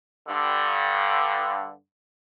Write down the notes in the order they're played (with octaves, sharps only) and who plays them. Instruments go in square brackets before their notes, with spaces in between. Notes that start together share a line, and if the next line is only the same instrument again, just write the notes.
[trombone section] G2 D3